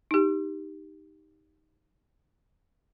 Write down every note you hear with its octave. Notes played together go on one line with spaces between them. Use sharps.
D#4 G4